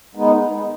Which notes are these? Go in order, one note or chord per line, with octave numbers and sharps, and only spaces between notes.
D#3 G#3 B3 D#4